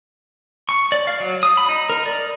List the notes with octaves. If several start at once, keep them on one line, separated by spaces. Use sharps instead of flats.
C#6
D5
F5
F#3
D#6
B5
D#4
A#4
D5